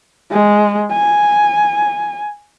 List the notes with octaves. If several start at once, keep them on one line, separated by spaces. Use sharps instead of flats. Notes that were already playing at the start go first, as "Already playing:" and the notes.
G#3
G#5